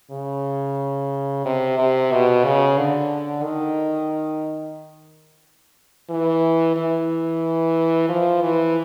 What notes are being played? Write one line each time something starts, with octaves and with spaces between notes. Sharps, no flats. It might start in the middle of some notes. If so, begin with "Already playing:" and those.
C#3
C3
C3
B2
C#3
D3
D#3
E3
E3
F3
E3